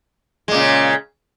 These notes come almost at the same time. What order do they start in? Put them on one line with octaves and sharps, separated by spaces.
G#3 A#2 C#3